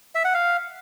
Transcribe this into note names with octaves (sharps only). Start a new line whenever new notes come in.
E5
F#5
F5